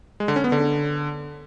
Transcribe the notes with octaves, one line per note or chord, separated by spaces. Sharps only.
G#3
D3
C#4
B3
D3